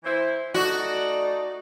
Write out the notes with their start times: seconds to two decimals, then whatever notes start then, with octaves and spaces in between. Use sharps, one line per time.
0.04 E3 E4 C5
0.54 A3 D#4 F#4 D5